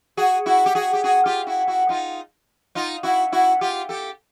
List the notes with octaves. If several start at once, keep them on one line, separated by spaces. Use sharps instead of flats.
F#4 G#4
E4 F#4
G4
F#4 G#4
G4
F#4 G#4
F4 G4
E4 F#4
E4 F#4
D#4 F4
D#4 F4
E4 F#4
E4 F#4
F4 G4
G4 A4